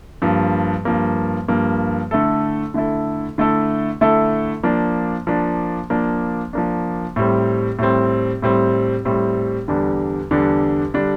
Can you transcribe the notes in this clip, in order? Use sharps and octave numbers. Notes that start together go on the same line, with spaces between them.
G2 F3 A#3
G2 F3 A#3
G2 F3 A#3
D3 A3 E4 A4
D3 A3 E4 A4
D3 A3 E4 A4
D3 A3 E4 A4
F3 A#3 D4
F3 A#3 D4
F3 A#3 D4
F3 A#3 D4
A2 G3 C4
A2 G3 C4
A2 G3 C4
A2 G3 C4
E2 D3 G3 D4
E2 D3 G3 D4
D3 G3 D4